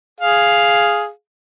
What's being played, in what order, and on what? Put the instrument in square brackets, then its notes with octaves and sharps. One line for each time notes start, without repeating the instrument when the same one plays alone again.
[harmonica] G#4 F5